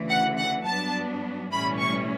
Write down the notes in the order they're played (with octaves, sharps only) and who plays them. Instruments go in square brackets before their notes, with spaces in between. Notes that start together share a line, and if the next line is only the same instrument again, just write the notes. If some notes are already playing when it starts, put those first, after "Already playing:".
Already playing: [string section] D2 C#3 E3
F#5
F#5
G2 F#3 B3 D4 A5
B1 A2 E3 G3 C#4 B5
C#6